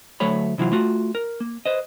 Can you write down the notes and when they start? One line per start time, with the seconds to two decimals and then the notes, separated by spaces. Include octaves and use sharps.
0.20 D2 F#3 A3 C#5 B5
0.58 C3 E3 F#3 F4
0.72 A3 F4 F#4
1.15 A#4
1.40 A#3
1.66 B4 C5 D#5